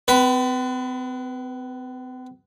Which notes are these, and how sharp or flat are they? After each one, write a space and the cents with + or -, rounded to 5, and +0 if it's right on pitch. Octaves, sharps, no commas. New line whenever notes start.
C4 -45 B4 +0